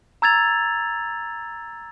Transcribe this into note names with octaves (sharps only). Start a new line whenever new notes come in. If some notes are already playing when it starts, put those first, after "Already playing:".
A#5 E6 G#6 A6 F7